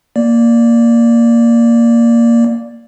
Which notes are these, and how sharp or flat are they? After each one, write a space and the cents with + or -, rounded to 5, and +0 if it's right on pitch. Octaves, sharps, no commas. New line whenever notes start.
A#3 +0 D5 +0